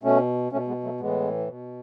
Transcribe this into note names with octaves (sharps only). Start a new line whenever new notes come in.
B2 A3 C#4
B2 A3 C#4
G#3 B3
F#3 A3
A2 E3 G#3 B3
B2